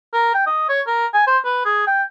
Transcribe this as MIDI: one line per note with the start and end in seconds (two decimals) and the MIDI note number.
0.13 0.31 70
0.34 0.44 79
0.46 0.65 75
0.69 0.81 73
0.87 1.06 70
1.14 1.24 80
1.27 1.38 72
1.45 1.63 71
1.65 1.85 68
1.87 2.03 79